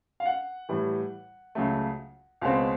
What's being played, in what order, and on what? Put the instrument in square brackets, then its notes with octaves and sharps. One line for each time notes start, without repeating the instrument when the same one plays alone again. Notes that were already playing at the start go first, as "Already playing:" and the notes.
[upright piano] F5
F#5
A2 E3 G3
C#2 C#3 F#3 A3
C#2 B2 G#3 C4 F5